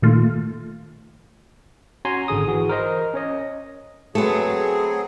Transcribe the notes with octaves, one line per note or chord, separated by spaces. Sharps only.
A#2 D#3 A3 F4
C#4 F#4 G#5 A#5 C6
G#1 D3 G#4 D#6
E3 F#4 G#4
A#4 C5 D#5
C#4 C#5 D#5
F#3 A3 B3 C4 G#4